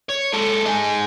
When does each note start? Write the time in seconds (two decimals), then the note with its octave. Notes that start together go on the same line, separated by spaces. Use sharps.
0.09 C#5
0.33 G#3 A4
0.65 D#4 G#4